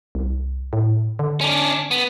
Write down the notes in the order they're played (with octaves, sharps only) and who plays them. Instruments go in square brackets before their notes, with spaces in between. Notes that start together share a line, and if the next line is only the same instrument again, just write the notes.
[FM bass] C2
A2
D3
[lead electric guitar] C#4 D4
B3